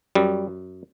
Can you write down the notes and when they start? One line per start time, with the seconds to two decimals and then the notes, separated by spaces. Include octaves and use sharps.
0.15 F#2 G3